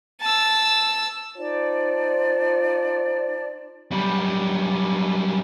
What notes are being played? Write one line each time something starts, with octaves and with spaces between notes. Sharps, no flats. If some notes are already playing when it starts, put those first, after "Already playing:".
A5 E6
D#4 F4 C5 D5 A5
F#2 G3